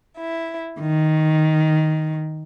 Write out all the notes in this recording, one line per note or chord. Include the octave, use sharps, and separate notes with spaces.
E4
D#3